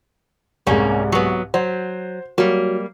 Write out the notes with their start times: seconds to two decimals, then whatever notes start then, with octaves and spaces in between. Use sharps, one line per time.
0.67 C2 G#2 G3 A#3 C#4
1.12 F#3 B3
1.54 F#3 C5
2.38 F#3 G3 A#3